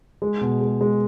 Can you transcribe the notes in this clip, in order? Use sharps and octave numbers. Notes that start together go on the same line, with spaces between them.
G#3
B2
G#3
G#3